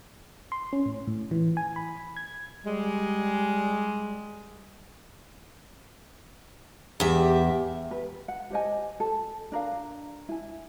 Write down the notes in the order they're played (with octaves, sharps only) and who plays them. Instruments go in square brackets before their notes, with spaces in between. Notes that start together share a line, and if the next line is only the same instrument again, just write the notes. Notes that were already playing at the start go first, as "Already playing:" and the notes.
[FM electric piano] C6
C#4
A2
A2
E3
G#5
B5
G#6
[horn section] G3 G#3
[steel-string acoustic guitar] E2 E5 [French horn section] G4
[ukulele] B4
F#5
G4 C5 D#5 G#5
A4
D4 A#4 F5
E4 G#5